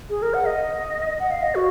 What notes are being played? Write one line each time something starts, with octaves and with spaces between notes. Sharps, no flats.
G#4
A#4
F#5
D#5
F#5
F5
D#5
F#4